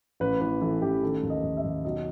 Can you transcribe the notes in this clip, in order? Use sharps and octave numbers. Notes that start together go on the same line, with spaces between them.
A1 B4
E3 B4
E3 A4
A1 G4
D#3 A4
D#2
D#5
D#2
E5
D#2
B1 D#5